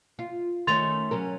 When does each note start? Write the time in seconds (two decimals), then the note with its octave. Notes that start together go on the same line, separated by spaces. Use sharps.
0.19 F4
0.67 D#3 A3 C#4 C6 A6 F7
1.11 F#3 C#4 A#4